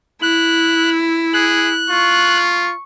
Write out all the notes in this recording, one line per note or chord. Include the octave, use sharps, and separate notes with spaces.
E4 F#6
G#4 F#6
F4 C#6